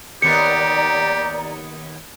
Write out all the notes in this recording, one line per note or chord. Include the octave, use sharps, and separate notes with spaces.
D#2 B3 G4 A#4 D5 A#5 C#7